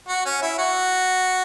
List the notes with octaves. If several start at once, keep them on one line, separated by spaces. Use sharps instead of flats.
F#4
C#4
E4
F#4